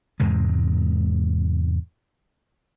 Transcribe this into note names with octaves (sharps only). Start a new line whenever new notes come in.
E2 G#2 C3 G#3